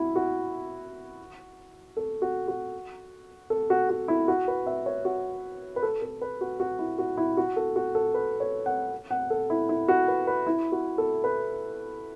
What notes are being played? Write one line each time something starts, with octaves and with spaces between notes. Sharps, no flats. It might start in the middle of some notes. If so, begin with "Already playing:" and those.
Already playing: E4 F#4
F#4
A4
F#4
F#4
A4
F#4
F#4
E4
F#4
B4
E5
C#5
F#4
B4
A4
A4
B4
F#4
F#4
E4
F#4
E4
F#4
A4
F#4
A4
B4
C#5
F#5
F#5
A4
E4
E4
F#4
B4
B4
E4
F#4
A4
B4